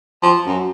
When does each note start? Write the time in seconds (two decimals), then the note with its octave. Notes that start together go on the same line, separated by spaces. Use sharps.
0.23 F3
0.47 F#2